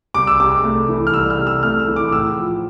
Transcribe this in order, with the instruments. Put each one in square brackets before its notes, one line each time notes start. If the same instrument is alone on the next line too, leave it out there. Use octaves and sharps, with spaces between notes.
[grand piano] C2 D6
E6
C3 D6
A3
E3
F6
C2 E6
F6
C3
E6
A3 F6
E6
E3
D6
A2 E6
F3